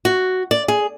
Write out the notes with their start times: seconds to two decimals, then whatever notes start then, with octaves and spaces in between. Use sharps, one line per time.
0.05 F#4
0.51 D5
0.68 G#4